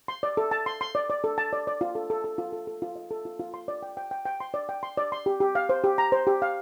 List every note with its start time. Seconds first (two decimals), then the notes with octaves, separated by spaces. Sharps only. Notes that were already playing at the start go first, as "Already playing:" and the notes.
0.08 C6
0.23 D5
0.37 A4
0.51 A5
0.66 C6
0.81 C6
0.95 D5
1.10 D5
1.24 A4
1.38 A5
1.53 D5
1.67 D5
1.81 F4
1.95 A4
2.10 A4
2.24 A4
2.38 F4
2.53 A4
2.67 A4
2.82 F4
2.96 D#5
3.11 A4
3.25 F4
3.39 F4
3.54 C6
3.68 D5
3.83 G5
3.97 G5
4.11 G5
4.25 G5
4.40 C6
4.54 D5
4.69 G5
4.83 C6
4.97 D5
5.12 C6
5.26 G4
5.40 G4
5.55 F5
5.69 C5
5.84 G4
5.98 A#5
6.12 C5
6.27 G4
6.42 F5